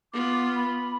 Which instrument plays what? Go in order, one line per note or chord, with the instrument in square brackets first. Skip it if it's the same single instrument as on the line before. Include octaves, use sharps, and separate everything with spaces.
[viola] B3 F4 [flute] D6
[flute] B5